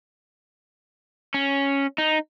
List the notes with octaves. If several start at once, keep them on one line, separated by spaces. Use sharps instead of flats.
C#4
D#4